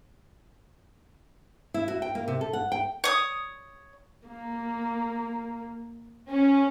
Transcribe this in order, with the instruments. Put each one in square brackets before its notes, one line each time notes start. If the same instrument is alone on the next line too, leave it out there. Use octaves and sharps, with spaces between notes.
[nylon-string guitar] E4
F#4
G5
A#3
C3
A4
F#5
G5
[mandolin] C#5 D#6
[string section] A#3
C#4